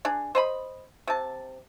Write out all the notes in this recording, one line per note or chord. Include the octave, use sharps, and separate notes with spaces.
D4 G#4
C5 D#5 B5
C3 A5